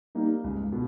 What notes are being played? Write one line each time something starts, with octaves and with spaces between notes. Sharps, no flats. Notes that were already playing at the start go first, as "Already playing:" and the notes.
G3 A#3 D#4
C#2
B2